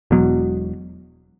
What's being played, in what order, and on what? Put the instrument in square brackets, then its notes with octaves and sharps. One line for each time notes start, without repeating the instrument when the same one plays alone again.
[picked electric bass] E1 E2 B2 F#3